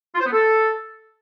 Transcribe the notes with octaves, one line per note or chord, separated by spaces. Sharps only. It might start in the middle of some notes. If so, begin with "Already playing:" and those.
F4
C5
B3
A4